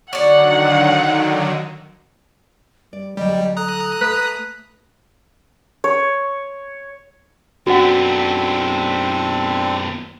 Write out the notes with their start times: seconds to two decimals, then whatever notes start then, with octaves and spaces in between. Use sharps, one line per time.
0.13 D3 D#3 F#3 C#5 D5 F#5
2.93 G3 D5
3.17 D2 F#3 G3 D#5
3.57 A4 A#5 D#6 F#6
4.01 A3 B4
5.84 C#5
7.67 F#2 B3 C4 D4 F#4 A4 F#5